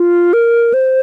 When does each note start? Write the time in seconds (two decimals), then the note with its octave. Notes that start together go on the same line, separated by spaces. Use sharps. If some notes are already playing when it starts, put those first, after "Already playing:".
Already playing: F4
0.33 A#4
0.74 C5